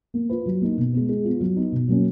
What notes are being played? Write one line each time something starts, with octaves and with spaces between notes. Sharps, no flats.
A#3
F4 B4
F#3
A#3 D#4
B2
G#3 B3
G#3
B3 F4
F#3
B3 D#4
B2
F#3 A#3 C#4